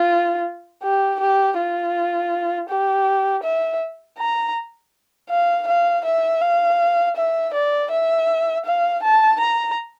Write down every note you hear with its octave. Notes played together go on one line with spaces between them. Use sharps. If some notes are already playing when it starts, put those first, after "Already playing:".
Already playing: F4
G4
G4
F4
G4
E5
A#5
F5
F5
E5
F5
E5
D5
E5
F5
A5
A#5